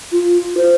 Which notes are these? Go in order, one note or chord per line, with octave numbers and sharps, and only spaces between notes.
F4
C5